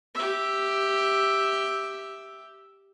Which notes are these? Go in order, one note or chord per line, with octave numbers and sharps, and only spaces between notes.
G4 E5